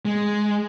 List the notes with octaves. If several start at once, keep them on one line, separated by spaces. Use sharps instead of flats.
G#3